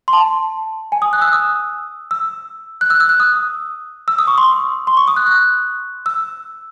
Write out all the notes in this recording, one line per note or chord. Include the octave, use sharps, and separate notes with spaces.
C6
A5
G#5
D#6
F#6
E6
D#6
E6
F#6
E6
E6
F#6
D#6
E6
D#6
C#6
C6
C6
C#6
D#6
F#6
F#6
E6